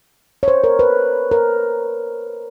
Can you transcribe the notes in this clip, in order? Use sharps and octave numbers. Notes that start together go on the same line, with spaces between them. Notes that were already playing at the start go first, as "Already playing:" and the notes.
C#5
C5
A#4
B4
A#4